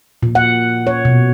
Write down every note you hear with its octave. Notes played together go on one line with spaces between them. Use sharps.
A#2
F#5
C#5
B2